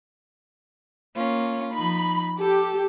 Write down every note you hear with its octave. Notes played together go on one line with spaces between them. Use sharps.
A#3 C#4 F4
F3 D#4 B5
G4 A4